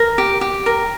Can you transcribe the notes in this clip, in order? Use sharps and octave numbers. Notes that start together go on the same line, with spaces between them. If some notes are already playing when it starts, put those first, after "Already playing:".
Already playing: A#4
G4
G4
A#4